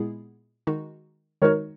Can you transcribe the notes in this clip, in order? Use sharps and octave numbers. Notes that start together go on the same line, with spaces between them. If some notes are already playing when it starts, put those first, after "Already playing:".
Already playing: A#2 G#3 B3 E4 G#4
D#3 G#3 D#4 F#4
D#3 G#3 D#4 F#4 A#4 C#5